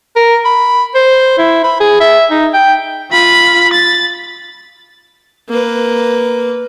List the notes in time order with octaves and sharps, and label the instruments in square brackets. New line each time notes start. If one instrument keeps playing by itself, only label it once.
[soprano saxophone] A#4
B5
C5
E4
B5
G#4
E5
D#4
G5
[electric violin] F4 B5
A6
[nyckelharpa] A#3 B4